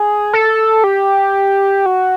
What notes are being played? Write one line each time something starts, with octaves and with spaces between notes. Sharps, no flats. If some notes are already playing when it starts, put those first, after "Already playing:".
Already playing: G#4
A4
G4
F#4